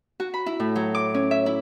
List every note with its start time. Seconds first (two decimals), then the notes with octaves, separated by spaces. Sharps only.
0.20 F#4
0.34 B5
0.46 E4
0.60 A2
0.76 F#3
0.95 D6
1.14 C#4
1.31 E5
1.46 E4